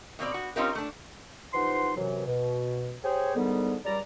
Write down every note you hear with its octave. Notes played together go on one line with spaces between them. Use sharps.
B2 A#3 C4 D5
F#4
C4 C#4 D#4 F4 G4 A#4
A3 D4
C3 E3 F3 D#4 F#5 C6
F#2 C3 E3 F#3
B2
G4 G#4 C5 C#5
G#2 D3 D#3 G3 B3
C#2 G3 D5 A#5